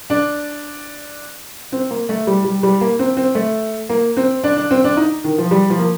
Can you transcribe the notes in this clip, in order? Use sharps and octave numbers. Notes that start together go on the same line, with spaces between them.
D4
C4
A#3
A3
G3
G3
G3
A#3
C4
C4
A3
A#3
C4
D4
D4
C4
D4
D#4
D#3
F3
G3
F3
A#3